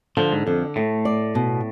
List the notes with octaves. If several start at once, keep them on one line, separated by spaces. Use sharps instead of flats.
D3 F3
G#2
F2 D3
A2 A3
D5
B2